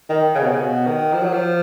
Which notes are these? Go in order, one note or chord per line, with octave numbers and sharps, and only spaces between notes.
D#3
C#3
B2
C#3
B2
D#3
F3
F#3
F3